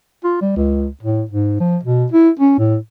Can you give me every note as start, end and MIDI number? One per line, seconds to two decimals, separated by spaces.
0.24 0.39 65
0.41 0.54 55
0.56 0.88 37
1.02 1.23 45
1.31 1.56 44
1.60 1.77 53
1.83 2.06 47
2.12 2.29 64
2.39 2.57 61
2.58 2.77 45